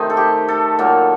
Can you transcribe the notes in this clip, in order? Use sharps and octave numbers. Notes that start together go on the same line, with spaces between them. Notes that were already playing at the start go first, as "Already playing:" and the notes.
Already playing: C3 D#3 A3 C4 D#4
A4
G4
A4
A#2 F#3 A#3